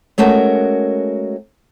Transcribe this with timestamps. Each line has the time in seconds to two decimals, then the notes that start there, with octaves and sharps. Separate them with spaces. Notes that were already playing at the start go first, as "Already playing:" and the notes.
0.18 G#3 A3 C#4 F#4 A#4